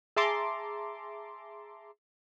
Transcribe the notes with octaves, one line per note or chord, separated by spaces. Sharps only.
G#4 E5 A5 A#5 C6 D6